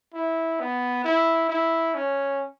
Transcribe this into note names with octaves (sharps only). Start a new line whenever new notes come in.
E4
B3
E4
E4
C#4